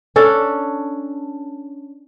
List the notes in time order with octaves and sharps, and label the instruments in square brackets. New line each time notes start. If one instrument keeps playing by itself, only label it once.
[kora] C#4 D4 A4